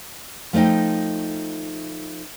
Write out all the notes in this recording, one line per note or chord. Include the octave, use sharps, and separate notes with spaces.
F3 A3 D#4 D#5 G5